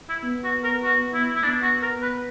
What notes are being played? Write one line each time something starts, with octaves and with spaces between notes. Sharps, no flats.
E4
B3
F#4
A#4
F#4
E4
E4
B3 D4
F#4
A#4
B4